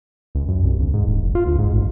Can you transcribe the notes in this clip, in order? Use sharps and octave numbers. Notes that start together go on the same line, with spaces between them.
C#2
F#2
C2
D2
G#2
D#1
F#1
F4
D2
G#2
A1